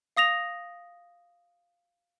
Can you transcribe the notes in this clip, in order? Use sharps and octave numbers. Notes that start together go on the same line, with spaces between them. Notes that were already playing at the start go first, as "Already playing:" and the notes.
F5 D#6 A#6 F7